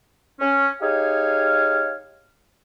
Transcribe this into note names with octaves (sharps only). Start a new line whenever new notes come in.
C#4
D#4 G4 G#4 C#5 F5